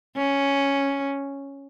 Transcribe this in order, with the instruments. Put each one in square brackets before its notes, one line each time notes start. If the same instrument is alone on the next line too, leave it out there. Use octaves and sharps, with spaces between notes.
[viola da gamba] C#4